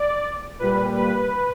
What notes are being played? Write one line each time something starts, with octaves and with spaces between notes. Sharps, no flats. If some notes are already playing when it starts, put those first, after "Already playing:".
Already playing: D5
A#2 G3 B4
B4